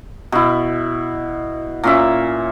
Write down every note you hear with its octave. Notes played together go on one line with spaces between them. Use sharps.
B2 E4
A#2 C#4 E5